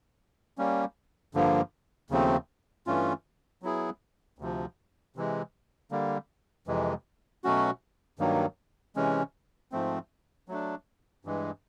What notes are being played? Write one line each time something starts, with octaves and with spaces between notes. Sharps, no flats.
G3 A#3 C#4
G2 D3 F3 A#3
D#2 C#3 F3 A3 C4
G2 E3 A3 C#4 F4
F#3 B3 E4 G#4
D2 C3 F3
C3 E3 G#3
D3 G3 A#3
F2 C3 E3 G#3
B2 F#3 A3 C#4 F#4
G2 D#3 F#3 A#3
C3 E3 G#3 C#4
G#2 F3 A3 C4
F#3 A3 D4
G2 E3 G#3